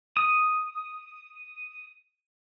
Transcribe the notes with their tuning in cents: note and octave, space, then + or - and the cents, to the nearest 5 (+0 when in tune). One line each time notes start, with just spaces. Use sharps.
D#6 +0